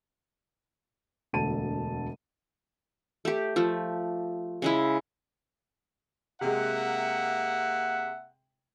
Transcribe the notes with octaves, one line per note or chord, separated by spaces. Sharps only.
E1 D2 A4 A5 D#7
A3 G4
F3 A3
C#3 G#3 E4
C3 G#3 A#3 E5 F#5